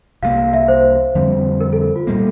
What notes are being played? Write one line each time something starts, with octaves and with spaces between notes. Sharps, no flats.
C2 C3 F3 A#3 F5
F5
E5
C5
F2 D3 G3 C4
A#4
A4
F4
A#2 G3 A#3